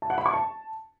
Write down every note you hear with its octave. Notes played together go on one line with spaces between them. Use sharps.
A5
F#5
B5
C#6
A5